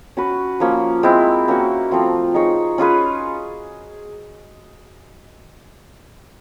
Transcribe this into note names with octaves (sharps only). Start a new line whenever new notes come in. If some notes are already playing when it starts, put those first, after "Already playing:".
C#4 F#4 B4
F3 A#3 C#4
G#3 C4 E4
A#3 C#4 F#4
F3 A3 C4 F4
D#4 G#4 C#5
C#4 F4 G#4 B4